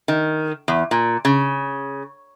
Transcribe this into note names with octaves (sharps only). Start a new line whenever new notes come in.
D#3
E2
A#2
C#3